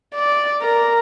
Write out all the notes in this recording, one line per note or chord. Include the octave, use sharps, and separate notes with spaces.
D5
A#4